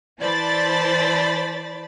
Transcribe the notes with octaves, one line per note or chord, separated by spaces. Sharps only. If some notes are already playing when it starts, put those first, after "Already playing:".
E3 C5 D5 A5 B5 A6